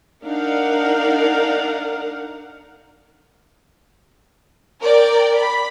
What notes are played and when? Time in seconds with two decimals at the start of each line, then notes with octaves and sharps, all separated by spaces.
0.23 D4 D#4 A#4 F5 F#5
4.80 A#4 D5 G5
5.36 B5